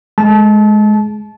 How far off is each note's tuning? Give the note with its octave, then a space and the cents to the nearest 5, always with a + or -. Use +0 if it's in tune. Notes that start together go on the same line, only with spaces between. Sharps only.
G#3 +20 A5 -25